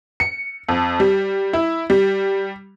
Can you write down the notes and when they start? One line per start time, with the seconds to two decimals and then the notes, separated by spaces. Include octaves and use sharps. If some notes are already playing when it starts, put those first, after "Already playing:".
0.20 C#7
0.69 F2
1.00 G3
1.53 E4
1.90 G3